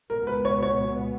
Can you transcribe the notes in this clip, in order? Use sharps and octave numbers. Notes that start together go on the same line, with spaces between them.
C#2 B2 G#3 B3 A#4
B4
C#5
C#5